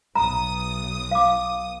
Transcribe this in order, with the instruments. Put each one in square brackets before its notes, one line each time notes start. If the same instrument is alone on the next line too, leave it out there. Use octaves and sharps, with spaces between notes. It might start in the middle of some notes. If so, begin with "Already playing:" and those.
[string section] B1 D#6 [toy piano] A#5
[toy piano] F5 D6